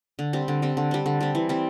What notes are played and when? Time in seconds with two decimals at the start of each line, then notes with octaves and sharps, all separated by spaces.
0.19 D3
0.33 G3 C4
0.48 D3
0.62 G3 C4
0.77 D3
0.91 G3 C4
1.06 D3
1.21 G3 C4
1.35 E3
1.49 G3 C4